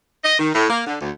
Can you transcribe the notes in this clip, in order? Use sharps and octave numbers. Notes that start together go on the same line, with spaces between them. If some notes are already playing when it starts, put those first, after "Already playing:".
D#5
D#3
A2
A#3
D3
D2